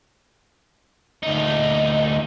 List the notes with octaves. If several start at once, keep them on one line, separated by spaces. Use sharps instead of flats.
D2 D#4